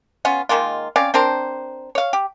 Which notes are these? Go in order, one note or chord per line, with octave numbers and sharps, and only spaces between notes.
B3 C#4 F4
D#3 G#3 A#3 F4
C4 C#4 D5 F5
C4 D4 A#4 C5
C#5 F5
G4